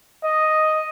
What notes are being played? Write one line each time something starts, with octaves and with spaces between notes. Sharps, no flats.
D#5